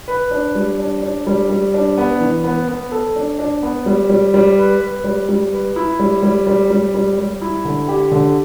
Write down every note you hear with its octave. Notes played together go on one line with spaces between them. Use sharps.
B4
D4
G3
D4
D4
G3
G3
D4
B3
E3
B3
B3
A4
D4
D4
B3
G3
G3
G3
B4
B4
G3
G3
B4
E4
G3
G3
G3
G3
G3
G3
E4
D3
G4
D3